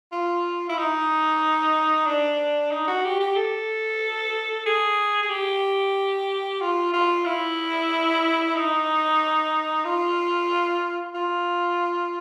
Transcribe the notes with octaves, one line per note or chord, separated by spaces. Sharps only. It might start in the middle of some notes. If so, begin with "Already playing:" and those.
F4
E4
D#4
D4
D#4
F#4
G4
G4
A4
G#4
G#4
G4
F4
F4
E4
D#4
F4
F4